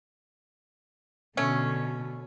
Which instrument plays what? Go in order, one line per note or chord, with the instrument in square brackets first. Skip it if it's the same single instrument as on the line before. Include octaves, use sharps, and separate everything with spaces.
[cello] B2 D3 [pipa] A3 C#4